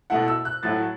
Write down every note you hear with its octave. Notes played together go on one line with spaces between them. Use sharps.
B2 A3 E4 F#5
E6
F#6
A2 F#3 A3 E4 A6